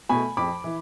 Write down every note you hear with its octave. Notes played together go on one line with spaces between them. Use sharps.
B2 A3 G#5 B5
F2 B5 D6
E3